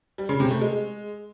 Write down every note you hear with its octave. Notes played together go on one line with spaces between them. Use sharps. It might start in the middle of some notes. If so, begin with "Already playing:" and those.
G3
C#3
C3
A3
G#3